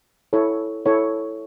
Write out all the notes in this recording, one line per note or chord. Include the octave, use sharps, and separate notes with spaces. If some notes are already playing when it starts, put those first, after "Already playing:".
E4 A4 C#5
E4 A4 C#5